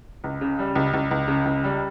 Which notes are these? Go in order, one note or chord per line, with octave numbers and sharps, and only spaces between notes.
C#2
C#3
G3
C#2
C#2
C#2
C#3
C#2
G3